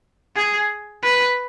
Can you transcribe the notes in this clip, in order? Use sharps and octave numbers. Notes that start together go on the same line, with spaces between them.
G#4
B4